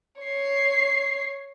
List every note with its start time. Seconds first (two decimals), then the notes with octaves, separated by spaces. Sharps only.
0.20 C#5 C7